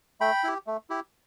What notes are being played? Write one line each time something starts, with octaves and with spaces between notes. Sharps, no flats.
A3 G5 B5
E4 G4
A3
E4 G4